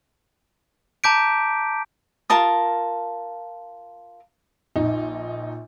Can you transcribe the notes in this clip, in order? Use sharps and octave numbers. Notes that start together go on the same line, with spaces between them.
A5 A#5 D6 G6 B6 D7
F4 A#4 A5 D#6
A#1 D#4